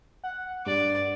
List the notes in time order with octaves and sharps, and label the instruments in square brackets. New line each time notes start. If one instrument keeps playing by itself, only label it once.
[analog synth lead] F#5
[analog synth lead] G2 [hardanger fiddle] D5